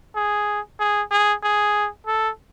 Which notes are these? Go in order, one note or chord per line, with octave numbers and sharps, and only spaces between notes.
G#4
G#4
G#4
G#4
A4